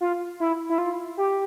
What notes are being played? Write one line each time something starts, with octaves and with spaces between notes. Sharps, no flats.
F4
E4
E4
F4
G4